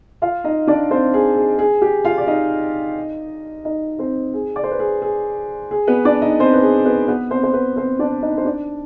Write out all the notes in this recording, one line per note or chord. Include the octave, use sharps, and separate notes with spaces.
F4 F5
D#4 D#5
D4 D5
C4 C5
G#4
G#4
G#4
G4
F4 F5
D5
D#4 D#5
D#4 D#5
C4 C5
G#4
D5
C5
B4
G#4
G#4
G#4
B3 B4
D4 D5
D#4 D#5
C4 C5
B4
G#4
B3 B4
B3 B4
C4 C5
C5
B3 B4
C4 C5
D4 D5
D#4 D#5
C5
D4 D5